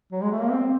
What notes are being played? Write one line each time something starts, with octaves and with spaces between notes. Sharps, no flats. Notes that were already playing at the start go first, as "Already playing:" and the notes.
F#3
G#3
A3
A#3
C4